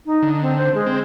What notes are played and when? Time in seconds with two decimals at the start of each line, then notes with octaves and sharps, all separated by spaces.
0.06 D#4
0.22 D3
0.41 C4
0.57 C5
0.75 G#3
0.87 C4